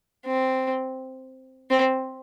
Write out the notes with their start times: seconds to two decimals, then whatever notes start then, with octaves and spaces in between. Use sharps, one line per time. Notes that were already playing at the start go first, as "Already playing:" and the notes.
0.26 C4
1.70 C4